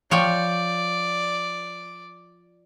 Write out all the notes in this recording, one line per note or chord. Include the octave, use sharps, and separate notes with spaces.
F3 C#5 D5 G5